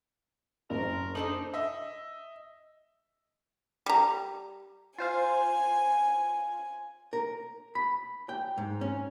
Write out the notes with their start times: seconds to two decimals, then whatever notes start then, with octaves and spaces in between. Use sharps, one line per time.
0.70 F#1 A#4
1.15 D4 D#4 A4 C5 F#7
1.54 D#5 E5
3.86 G3 A#5
4.98 F4 C5 F5 G#5
7.13 A#4
7.75 B5
8.29 G5
8.58 G#2
8.81 C#4